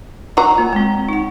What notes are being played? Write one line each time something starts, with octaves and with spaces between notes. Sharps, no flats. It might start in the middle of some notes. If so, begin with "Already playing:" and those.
F#3 F#4 A#5
A#3 F4
G#3 C4
D#4 F#5